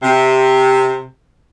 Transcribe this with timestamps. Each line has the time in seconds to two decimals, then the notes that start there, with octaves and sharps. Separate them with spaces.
0.02 C3